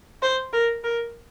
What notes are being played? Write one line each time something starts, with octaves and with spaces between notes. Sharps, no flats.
C5
A#4
A#4